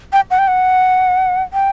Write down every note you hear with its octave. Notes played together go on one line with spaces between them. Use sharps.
G5
F#5
G5
F#5
G5